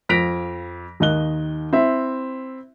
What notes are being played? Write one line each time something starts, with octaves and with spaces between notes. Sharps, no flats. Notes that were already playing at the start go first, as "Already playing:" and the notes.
F2 A#6 B6 D7 F7
D#2 D#3 D#5 F#6 G7
C4 E4 E5